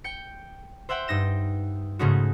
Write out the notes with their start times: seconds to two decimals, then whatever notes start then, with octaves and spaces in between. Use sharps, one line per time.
0.04 G5 C#7
0.89 C5 E5 F#5 G5
1.08 G2 D#4 A#6 E7
1.99 G#2 C#3 A3 C#4 D#4 F#4